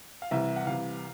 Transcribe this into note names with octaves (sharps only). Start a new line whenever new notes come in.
F5
C2 C3 E3 E5
F#5
C2 C3 E3 F5